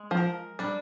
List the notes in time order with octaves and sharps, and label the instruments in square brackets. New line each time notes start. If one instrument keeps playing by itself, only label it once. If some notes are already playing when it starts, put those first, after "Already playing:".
Already playing: [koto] G#3
[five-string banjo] F3
[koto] A#4
[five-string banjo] G3 [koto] D4